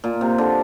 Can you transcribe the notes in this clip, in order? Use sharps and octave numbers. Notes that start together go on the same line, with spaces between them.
A#2
C3
D3